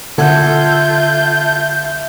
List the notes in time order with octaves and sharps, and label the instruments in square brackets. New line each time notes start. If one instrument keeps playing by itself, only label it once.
[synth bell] D3 F#5 G#6 [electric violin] F4 G6 [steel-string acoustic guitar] A4 [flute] E5